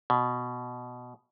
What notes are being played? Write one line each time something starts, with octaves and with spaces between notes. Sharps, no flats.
B2